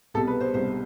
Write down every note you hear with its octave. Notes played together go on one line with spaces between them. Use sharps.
C2 B2 G3 A4
B4
C5
C2 B2 G3 C5